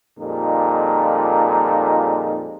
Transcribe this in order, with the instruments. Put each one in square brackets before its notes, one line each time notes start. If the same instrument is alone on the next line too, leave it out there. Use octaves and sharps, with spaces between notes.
[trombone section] F2 A#2 G3 G#3 D#4